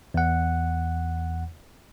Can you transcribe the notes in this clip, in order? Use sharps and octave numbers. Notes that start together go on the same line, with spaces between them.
E2 F#5